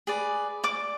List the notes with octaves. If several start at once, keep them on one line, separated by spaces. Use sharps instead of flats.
G#4 B4 D5
D5 D6